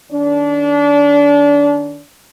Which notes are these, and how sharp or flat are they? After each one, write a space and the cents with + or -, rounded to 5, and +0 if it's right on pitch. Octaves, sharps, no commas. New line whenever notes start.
D#3 -15 D4 -30